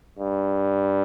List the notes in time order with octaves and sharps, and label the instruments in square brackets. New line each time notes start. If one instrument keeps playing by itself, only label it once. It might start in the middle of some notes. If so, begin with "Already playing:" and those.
[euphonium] G2